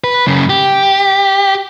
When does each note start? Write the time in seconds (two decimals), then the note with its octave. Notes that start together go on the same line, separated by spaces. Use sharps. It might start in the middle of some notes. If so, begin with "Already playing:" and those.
0.04 B4
0.27 F#2 C#3
0.50 G4